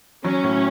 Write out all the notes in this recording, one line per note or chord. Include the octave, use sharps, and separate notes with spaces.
F#3 C#4
A2